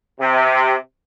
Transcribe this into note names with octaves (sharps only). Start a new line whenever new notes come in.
C3